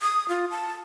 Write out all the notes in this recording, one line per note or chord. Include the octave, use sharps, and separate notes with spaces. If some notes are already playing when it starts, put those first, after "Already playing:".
D#6
F4
A5